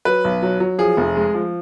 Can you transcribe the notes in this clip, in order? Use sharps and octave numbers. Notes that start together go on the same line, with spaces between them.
F#3 B4
B1
F#3
F#3
F3 G#4
F1
G#3
F3